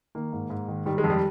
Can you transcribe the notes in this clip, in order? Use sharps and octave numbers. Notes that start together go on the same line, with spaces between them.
D#3 A#3
G#2
G#2
D#3
D#3 G3
G#3
F2
G3